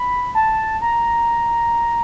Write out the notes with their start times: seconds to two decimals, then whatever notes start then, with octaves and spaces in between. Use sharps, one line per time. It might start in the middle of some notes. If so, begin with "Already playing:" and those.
Already playing: B5
0.35 A5
0.82 A#5